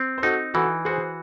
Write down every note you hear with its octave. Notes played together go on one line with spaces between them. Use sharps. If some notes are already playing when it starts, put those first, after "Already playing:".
Already playing: C4
C5
D#4 F#4 A4
E3 F#4 A4
F#4 G#4 C5